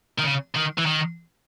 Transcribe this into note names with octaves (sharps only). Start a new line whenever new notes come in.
D#3
C#3
D#3
E3
D#3